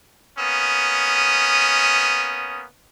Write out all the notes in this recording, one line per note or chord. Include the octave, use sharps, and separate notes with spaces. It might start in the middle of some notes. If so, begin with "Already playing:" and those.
A#3 B3 C#4 D#6